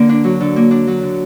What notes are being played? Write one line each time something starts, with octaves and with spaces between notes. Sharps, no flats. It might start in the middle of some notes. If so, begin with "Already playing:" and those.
Already playing: D3 A#3
D4
F#3
D3
A#3
D4
F#3
D3